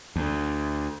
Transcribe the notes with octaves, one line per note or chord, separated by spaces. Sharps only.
D2